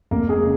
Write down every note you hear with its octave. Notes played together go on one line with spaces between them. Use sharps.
F1 A#3 A#4
G#3 G#4
C#3